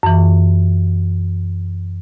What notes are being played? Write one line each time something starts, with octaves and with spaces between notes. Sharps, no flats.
F#2 E3